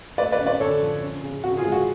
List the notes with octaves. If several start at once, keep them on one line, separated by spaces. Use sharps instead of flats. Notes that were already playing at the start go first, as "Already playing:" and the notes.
A3 B4 D5
B4 D5
C#4
B4 D5
D3 A4 C#5
F3
C#4
C#3
C#3 F#4
F4 G#4
G#3
F#4